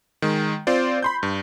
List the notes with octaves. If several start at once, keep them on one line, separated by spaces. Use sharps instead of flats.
D#3 G#3
C4 F4 C5 D5
B5 C6 G6
G2